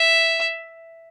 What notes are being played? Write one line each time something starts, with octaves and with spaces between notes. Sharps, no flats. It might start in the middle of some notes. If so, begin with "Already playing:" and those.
Already playing: E5